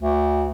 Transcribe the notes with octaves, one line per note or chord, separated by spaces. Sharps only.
D2